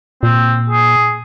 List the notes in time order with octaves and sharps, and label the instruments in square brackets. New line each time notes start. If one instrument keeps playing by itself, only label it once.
[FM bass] A#2 [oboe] C4
[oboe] G#4